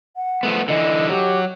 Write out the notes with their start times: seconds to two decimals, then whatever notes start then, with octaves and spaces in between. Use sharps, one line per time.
0.16 F#5
0.43 F3 A3 B3
0.68 D3 E3 D#5
1.09 F#3 G4